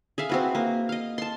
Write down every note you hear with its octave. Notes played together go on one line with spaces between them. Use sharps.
G#4 E5 F5
C4 F#4 B4
A#3
D#5 F5
A5 C6